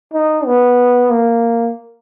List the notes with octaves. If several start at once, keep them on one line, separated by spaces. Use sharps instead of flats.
D#4
B3
A#3